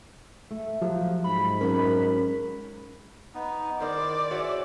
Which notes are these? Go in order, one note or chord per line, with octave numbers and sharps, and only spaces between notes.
A3
F3 F#3 G4
G#2 B5
F#3 C#4 A#4
B3 D#4
E2 D#3 C5 D5 C6
F#4 G#4 C5 C#5 E5